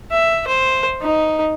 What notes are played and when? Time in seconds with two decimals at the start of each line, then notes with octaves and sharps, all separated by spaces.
0.11 E5
0.47 C5
1.01 D#4